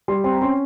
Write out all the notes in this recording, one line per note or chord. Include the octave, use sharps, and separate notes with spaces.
G3 C6
C4 C6
A#5
C#4 C6